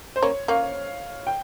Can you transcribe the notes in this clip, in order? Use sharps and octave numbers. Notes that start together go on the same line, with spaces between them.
C5
A#3 C#4 C#5
A#3 C#4 F5
G5